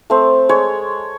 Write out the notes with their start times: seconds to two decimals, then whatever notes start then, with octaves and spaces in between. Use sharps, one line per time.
0.10 A3 C4
0.49 G#3 C#5